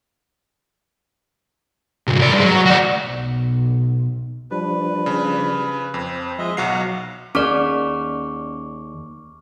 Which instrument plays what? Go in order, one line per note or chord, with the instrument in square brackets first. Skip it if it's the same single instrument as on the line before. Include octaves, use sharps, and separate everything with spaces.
[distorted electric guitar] C2 G2
C2 D5
G2 G#3
F#3
F#4 D5
[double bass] B1
[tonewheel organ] F3 G3 D4 [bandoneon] B4
[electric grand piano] C#3
[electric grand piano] F2 [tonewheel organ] C5
[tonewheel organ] F3 D#6 [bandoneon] G#3 D#5 E5
[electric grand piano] B1 F#3 C7 [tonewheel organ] F5 A#5 [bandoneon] F#5
[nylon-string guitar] D#2 G#4 [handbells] C#4 D5 [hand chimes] C#6 D6 F6